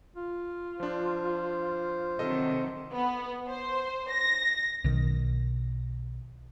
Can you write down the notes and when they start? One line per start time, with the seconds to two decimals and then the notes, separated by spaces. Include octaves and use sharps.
0.16 F4
0.80 F3 D4 C5
2.19 C3 D#3 F#3 A4 D#5
2.93 B3
3.49 C5
4.11 A#6
4.84 B1 D#3